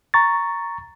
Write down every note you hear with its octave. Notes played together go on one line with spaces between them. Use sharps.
A#5 C#6 A6